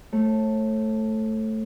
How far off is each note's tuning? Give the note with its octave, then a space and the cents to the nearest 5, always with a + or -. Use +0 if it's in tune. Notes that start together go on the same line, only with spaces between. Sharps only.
A3 +0 C#5 -35